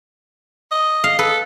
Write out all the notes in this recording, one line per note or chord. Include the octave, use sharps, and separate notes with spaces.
D#5
F5
A4 B4